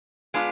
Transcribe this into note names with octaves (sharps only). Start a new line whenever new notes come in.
G#3 B3 D4 F4